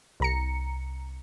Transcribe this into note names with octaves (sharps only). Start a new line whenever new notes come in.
C2 A#5 C#7